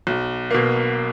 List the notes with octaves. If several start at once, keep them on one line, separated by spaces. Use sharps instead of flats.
B1
B2 A#3